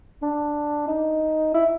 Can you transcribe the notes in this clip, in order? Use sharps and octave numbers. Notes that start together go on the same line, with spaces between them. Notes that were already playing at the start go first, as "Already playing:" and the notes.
D4
D#4
E4